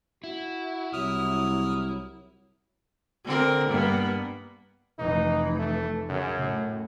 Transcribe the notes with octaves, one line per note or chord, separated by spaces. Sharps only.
E4 F#4
C2 F#3 D#6 F6
D3 C4 A#4
G2 A#3 B3
F1 E3 D#4
A3
F#2 C#3
A2